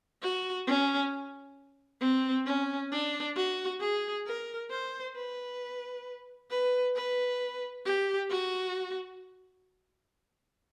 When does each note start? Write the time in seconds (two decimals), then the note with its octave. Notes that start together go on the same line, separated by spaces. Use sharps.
0.22 F#4
0.67 C#4
2.01 C4
2.46 C#4
2.92 D4
3.36 F#4
3.80 G#4
4.26 A#4
4.71 C5
5.16 B4
6.50 B4
6.96 B4
7.85 G4
8.30 F#4